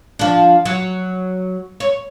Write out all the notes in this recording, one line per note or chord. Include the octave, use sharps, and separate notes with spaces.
F3 D4
F#3
C#5